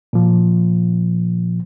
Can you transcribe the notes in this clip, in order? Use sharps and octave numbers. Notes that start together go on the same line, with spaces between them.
A#2 F3